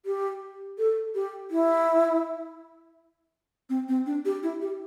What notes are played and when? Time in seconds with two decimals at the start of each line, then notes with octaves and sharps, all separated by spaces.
0.06 G4
0.78 A4
1.15 G4
1.51 E4
3.70 C4
3.89 C4
4.06 D4
4.25 G4
4.43 E4
4.61 G4